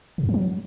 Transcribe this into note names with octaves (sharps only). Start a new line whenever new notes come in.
B2
F2
E3
F#3